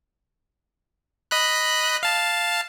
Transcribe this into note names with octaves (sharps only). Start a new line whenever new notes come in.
D#5 B5 F#6
F5 A5